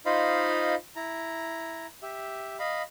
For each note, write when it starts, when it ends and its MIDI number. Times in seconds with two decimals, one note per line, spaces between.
0.06 0.75 63
0.06 0.75 65
0.06 0.75 72
0.06 0.75 75
0.06 0.75 77
0.06 0.75 83
0.96 1.86 64
0.96 1.86 82
2.02 2.57 67
2.02 2.57 76
2.59 2.83 75
2.59 2.83 77
2.59 2.83 83